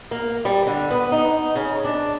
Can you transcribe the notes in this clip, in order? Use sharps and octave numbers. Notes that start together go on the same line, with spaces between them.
A#3
G3
D3
B3
D#4
C#3
D4